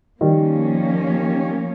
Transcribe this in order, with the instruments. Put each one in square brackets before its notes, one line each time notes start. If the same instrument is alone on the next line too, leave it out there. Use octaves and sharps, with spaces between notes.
[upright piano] D#3 G3 [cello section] F3 A#3 C#4